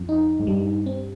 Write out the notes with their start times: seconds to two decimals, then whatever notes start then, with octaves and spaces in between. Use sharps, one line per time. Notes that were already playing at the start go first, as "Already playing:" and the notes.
Already playing: F2
0.09 D#4
0.40 G#2
0.47 G2 G3
0.86 C4